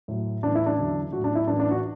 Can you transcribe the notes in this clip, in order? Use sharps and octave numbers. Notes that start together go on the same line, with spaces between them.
A2 F#3
A2 E3 D4
E4
D4
E2 D3 F#3
A2 F#3 F#4
D4
E4
A2 E3 D4
D4
F#4